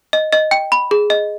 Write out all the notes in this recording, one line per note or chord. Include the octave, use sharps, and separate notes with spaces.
D#5
D#5
G5
B5
G#4
D#5